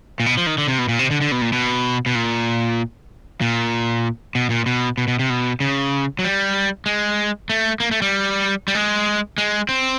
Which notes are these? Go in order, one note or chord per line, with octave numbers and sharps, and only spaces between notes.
A#2
B2
F3
D#3
D3
C3
B2
A#2
C3
D3
D3
B2
A#2
B2
B2
A#2
A#2
B2
A#2
B2
B2
B2
C3
B2
C#3
F#3
G3
G#3
A3
A#3
A3
G3
G3
G#3
G#3
C4